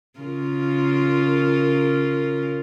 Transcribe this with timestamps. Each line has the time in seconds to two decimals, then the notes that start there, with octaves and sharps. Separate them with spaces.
0.20 C#3 F4 A#4